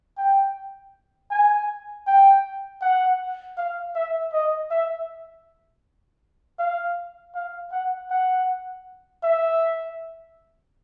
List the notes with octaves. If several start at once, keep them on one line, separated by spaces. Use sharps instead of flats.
G5
G#5
G5
F#5
F5
E5
D#5
E5
F5
F5
F#5
F#5
E5